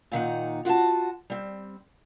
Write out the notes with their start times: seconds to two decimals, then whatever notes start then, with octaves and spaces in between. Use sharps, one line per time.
0.12 A#2 D#3 D#4 F#5
0.65 F4 F#4 F5 F#5 A5
1.30 G3 C4